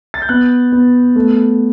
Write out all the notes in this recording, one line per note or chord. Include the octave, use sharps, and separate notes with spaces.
A6
G6
B3 F#6
B3
A3